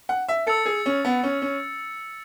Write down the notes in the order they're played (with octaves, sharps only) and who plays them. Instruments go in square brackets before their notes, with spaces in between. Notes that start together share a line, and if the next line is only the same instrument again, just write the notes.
[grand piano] F#5
E5
[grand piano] A4 [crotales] E6 A6 C#7
[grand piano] G#4
C#4
B3
C#4
C#4